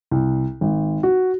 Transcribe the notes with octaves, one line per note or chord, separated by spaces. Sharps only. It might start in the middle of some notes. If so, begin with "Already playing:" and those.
C2
G#1
F#4